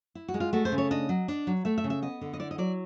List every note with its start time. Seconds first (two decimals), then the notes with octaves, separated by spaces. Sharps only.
0.15 E4
0.28 F#4
0.34 G#3
0.40 F4
0.53 A3 F#4
0.65 C5
0.72 C#3
0.78 C#5
0.91 D4 D#5
1.09 F#3
1.28 D4
1.47 F#3
1.65 A3 E5
1.78 E5
1.84 C#3
1.90 E5
2.02 B3 D#5
2.21 D3
2.33 D#5
2.40 E4 D5
2.51 D#5
2.58 F#3 D5